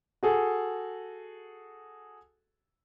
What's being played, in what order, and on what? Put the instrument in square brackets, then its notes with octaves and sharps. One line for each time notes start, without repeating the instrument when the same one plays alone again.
[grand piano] F#4 G#4 A4